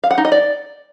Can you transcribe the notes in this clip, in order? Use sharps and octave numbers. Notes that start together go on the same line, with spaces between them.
F5
F#5
D#4
D#5
D5